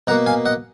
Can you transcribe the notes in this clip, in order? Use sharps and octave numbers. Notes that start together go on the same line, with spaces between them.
B2 A#3 F#5 A#5
F5 G#5
D#5 F#5